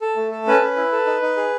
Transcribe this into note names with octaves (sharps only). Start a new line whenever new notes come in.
A4
A3
A4
C#4 B4
C#4
E4
A4
D#4
D#4
G#4